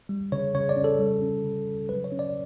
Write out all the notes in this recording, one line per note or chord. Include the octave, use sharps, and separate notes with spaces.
G3
C#3 C#5
C#3 C#5
D5
C#4
A4
G3
C#4
C#3
C#3
F#3 B4
C#5
C#4
D5